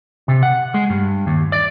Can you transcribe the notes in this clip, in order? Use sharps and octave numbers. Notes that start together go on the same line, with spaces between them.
C3
F#5
G#3
G2
D#2
D5